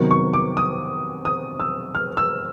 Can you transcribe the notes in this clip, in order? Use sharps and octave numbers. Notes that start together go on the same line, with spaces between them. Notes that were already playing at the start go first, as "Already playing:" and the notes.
Already playing: C3 D#3 F#3 B3
C#6
D6
D#6
D#6
E6
F6
E6